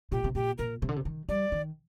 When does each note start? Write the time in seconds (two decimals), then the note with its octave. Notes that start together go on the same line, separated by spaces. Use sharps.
0.12 A#2 G4
0.24 C3
0.35 A#2 G4
0.58 A#2 A#4
0.82 C3
0.89 D3
0.96 C3
1.05 D#3
1.29 G3 D5
1.52 D#3